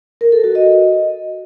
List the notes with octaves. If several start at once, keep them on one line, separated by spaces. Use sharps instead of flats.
A#4
A4
F#4
D#5